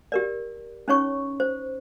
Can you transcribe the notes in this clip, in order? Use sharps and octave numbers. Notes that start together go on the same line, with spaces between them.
G4 A#4 D5
C#4 D#4 C#5 C#6
C5